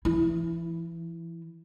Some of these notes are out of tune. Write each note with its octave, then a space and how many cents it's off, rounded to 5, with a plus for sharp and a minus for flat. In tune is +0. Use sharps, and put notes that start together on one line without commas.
E3 +35 E4 +0